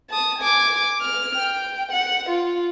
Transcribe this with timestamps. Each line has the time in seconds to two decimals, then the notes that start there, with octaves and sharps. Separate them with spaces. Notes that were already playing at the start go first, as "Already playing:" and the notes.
0.10 A5 D#6
0.39 G#5 D6
1.01 F6
1.37 G5
1.92 F#5
2.30 F4